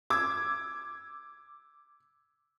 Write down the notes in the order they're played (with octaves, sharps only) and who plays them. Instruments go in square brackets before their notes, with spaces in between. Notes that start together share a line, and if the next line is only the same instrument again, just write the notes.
[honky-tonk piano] D6 E6 G#6